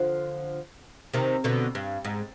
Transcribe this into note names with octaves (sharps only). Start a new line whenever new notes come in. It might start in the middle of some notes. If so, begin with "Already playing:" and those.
Already playing: D3 F3
C3 D#3
B2 D3
G2
G#2